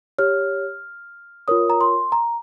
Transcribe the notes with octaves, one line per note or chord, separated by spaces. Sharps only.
G4 C#5 F6
F4 A#4 C#5 D#6
A#5
C6
A#5